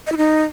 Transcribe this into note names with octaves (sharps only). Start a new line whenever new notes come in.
D#5
E4
D#4